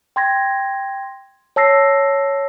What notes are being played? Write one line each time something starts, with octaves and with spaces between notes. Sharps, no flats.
G5 C6 G#6 A#6
C#5 A5 E6 A#6 C7